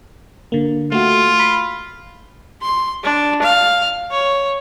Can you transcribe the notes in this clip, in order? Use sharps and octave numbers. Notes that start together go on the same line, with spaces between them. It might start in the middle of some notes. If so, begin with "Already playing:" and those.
D3 A#3
A3 F4 F#4
B5
C6
D4
F5
C#5